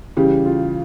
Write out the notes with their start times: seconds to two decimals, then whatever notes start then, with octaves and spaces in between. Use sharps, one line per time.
0.17 C#3 E3 G3 G4
0.46 F4